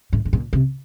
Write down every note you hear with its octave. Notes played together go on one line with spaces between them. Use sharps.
A2
A2
A#2
C3